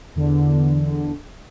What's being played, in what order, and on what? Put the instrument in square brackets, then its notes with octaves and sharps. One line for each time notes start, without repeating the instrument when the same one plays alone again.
[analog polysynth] E2 D3